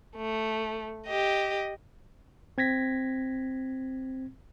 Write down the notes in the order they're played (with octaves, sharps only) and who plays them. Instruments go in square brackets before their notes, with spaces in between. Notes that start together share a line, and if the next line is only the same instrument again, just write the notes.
[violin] A3
G4 D#5
[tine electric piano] C4 G#6 A#6 B6